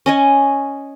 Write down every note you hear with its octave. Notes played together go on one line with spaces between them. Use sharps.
C#4 D#5 G#5